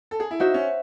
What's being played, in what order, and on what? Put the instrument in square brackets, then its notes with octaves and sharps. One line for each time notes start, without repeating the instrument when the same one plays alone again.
[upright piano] A4
G#4
E4
[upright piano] D#4 [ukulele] F#4 C5 E5
[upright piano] C#4